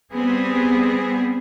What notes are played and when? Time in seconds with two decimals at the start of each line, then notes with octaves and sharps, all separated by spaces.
0.12 G3 B3 C4 G#4